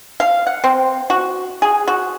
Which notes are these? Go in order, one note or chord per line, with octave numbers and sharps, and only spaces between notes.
F5
F#5
C4
F#4
G#4
F#4